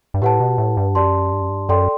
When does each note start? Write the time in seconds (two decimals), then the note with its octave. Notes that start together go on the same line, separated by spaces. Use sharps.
0.14 G2
0.22 A2 G4 B4 F#5 A5
0.40 B2
0.58 A2
0.77 G2
0.95 F#2 G4 D5 A5 C6
1.33 G2
1.41 F#2
1.49 G2
1.69 F#2 A4 D5 G5 C6